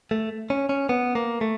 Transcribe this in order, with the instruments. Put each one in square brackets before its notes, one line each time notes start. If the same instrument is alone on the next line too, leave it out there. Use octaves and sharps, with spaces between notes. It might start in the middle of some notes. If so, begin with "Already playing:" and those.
[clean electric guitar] A3
C#4
C#4
B3
A#3
A3